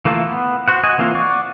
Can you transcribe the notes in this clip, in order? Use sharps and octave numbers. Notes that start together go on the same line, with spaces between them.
E3 A3 A#3 F4 A4
B3
F#4 C5 F#5
F#4 D#5 G#5
E3 A#3 C4 F4
D5 F#5 C#6